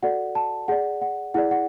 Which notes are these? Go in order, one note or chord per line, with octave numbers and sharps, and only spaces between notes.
F#4 A4 D5 F#5
A5
G#4 D5 F#5
F#5
E4 G#4 D5 F#5
F#5